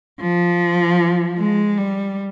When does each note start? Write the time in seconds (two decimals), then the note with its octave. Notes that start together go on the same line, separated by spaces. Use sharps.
0.20 F3
1.38 G#3
1.78 G3